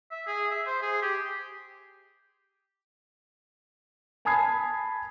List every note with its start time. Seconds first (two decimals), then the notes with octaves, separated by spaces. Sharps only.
0.11 E5
0.27 G#4
0.51 E5
0.66 C5
0.82 G#4
1.02 G4
4.25 G#5 A5 B5 D#6 G#6 C7